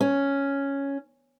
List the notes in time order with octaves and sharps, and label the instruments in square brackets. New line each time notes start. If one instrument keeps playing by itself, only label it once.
[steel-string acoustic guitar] C#4